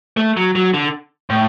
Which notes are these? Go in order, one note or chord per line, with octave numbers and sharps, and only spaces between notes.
A3
F#3
F#3
D3
A2